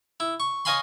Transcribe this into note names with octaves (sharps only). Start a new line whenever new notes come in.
E4
C#6
C#5 D#5 F5 G#5 B5 C6